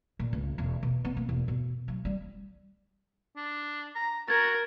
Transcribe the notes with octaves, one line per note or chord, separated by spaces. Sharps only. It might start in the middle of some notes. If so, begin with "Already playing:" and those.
A#2
C#2
E1
B2
B3
A#3
E1
B2
F#3
G3
D4
A#5
F#4 A#4 G#6 A6